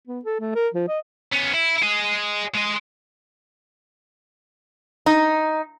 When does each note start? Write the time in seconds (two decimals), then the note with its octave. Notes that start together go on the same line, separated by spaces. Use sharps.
0.07 B3
0.25 A4
0.40 A3
0.55 A#4
0.74 F3
0.88 D#5
1.32 B3 C#4
1.53 E4
1.83 G#4 D#5
2.55 G#3 D#5
5.06 D#4